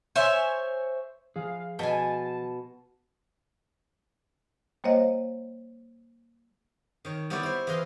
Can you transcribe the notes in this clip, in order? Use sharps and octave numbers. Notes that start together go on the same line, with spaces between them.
C5 C#5 E5 G#5
F3 G#4 F5
B2 G#5 A5
G3 A#3 C5 C#5 D#5 F5
D#3 C#5
G3 B3 E4 B4 C#5 D5
E4 C5
E3 G#4 B4 D#5 F5 C6